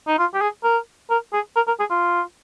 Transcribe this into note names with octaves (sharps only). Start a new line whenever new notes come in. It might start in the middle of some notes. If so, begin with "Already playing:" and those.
D#4
F4
G4
G#4
A#4
A#4
G#4
A#4
A#4
G#4
F4